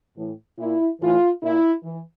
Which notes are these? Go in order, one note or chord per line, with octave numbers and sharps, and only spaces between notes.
A2 E3
A#2 E4
A2 E3 F4
A#2 E4
E3